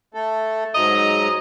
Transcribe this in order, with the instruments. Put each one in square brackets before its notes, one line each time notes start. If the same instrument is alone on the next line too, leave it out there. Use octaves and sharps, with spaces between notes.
[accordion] A3 A4
[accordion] G#2 F#3 A#5 [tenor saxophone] D#5